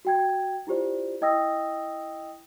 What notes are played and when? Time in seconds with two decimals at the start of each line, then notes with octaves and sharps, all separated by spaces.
0.05 F#4 G5 G#6
0.67 E4 F4 G4 C5 D5
1.22 E4 D#5 G5 D#6 E6 A#6